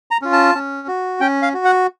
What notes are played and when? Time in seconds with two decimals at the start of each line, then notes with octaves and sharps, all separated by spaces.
0.11 A#5
0.22 C#4 F4
0.33 A5
0.55 C#4
0.88 F#4
1.20 C#4 G5
1.42 F5
1.54 F#4
1.65 F#5